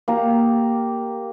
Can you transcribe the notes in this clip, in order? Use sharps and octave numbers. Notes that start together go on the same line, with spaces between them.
A#3 G4 A#5